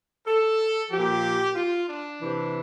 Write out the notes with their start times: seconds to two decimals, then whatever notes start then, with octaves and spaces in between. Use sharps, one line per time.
0.27 A4
0.91 F3 G4
0.97 A#2
1.55 F4
1.88 D4
2.20 C3 E3